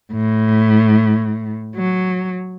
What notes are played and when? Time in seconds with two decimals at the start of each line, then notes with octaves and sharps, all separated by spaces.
0.12 A2
1.76 F#3